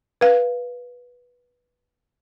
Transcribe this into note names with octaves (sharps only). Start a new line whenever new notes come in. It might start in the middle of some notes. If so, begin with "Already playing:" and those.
B4 F5